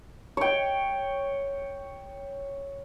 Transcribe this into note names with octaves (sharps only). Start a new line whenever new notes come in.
C#5 G5